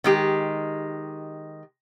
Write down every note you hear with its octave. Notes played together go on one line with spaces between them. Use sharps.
D#3 G#3 G4